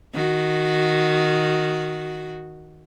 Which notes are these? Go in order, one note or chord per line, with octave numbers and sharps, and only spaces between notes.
D#3 F#4